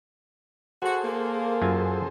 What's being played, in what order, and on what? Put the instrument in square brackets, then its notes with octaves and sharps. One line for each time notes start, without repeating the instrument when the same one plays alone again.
[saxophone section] F#4 [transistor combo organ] G#4 A4 C5
[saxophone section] A#3
[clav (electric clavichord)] F#2 F4 G#5